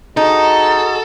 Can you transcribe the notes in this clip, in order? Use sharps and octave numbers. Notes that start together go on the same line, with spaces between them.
D#4 F#4 G#4 A4 D#5 A#5